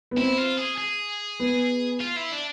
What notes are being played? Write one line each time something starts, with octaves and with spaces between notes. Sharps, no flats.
B3
C4 E4
F4
G#4
G#4
B3
F4
E4
D4